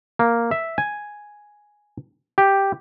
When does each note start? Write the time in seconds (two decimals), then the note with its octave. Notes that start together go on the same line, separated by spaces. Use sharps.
0.19 A#3
0.51 E5
0.78 G#5
2.38 G4